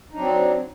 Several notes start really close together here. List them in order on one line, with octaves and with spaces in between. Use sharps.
D#4 D4 F#3 C4